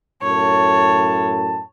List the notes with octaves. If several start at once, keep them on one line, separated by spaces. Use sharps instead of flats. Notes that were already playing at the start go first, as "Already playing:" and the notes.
F#2 A2 C#5 A5